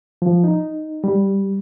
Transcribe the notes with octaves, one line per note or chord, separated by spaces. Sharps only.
F3
D#4
G3